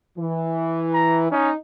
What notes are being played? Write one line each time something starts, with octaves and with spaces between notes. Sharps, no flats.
E3
A#5
C#4 D#4